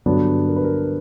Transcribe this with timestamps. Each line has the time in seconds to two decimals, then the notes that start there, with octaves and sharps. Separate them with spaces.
0.06 G2 D3 F#3 B3 D4
0.48 A#4
0.56 B4
0.64 A#4